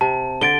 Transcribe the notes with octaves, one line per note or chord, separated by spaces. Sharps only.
C3 A5
D3 A6 D7 G7